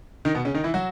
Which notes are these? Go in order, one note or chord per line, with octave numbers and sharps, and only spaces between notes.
D#3 D#4
B2 B3
C#3 C#4
D#3 D#4
E3 E4
F#3 F#4